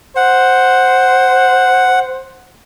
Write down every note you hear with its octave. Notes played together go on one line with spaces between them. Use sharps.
C5 F#5